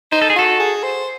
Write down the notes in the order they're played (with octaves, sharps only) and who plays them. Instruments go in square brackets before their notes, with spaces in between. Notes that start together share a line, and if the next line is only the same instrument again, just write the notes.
[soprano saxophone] D#4 [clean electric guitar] C5
[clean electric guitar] A4
G#4
[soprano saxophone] F#4 [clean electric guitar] A4
[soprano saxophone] G#4
C5